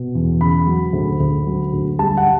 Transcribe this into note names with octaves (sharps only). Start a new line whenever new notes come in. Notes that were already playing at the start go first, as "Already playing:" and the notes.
Already playing: B2
E2
C#3 B5
F#3
D2
D2
F#3
D2
G3 A5
F#5